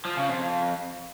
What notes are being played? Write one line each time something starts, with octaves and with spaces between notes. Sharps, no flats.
F3
C#3
F2